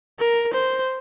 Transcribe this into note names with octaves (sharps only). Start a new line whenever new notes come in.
A#4
C5